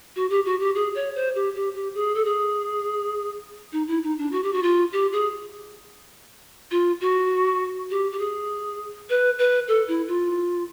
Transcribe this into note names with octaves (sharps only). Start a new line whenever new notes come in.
F#4
G4
F#4
G4
G#4
C#5
C5
G4
G4
G4
G#4
A4
G#4
D#4
E4
D#4
D4
F#4
G4
F#4
F4
G4
G#4
F4
F#4
G4
G4
G#4
B4
B4
A4
E4
F4